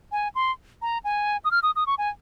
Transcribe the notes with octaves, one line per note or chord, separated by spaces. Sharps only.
G#5
C6
A#5
G#5
D#6
F6
D#6
D#6
C#6
G#5